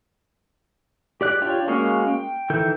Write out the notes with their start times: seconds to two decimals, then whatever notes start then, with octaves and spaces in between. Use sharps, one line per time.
1.21 G4 D5 F#6
1.42 D4 F4 G4 C#5 D5
1.68 G#3 A#3 C#4 F#4 F5
2.08 G5
2.50 D#3 E3 A4 G6